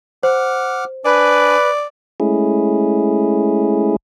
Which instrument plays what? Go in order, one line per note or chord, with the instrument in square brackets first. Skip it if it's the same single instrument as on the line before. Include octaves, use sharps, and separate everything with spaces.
[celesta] C5 [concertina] F#5 D6 F6
[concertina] D4 G#5 [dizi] B4 [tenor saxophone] D5
[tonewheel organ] G#3 A3 C#4 E4 G#4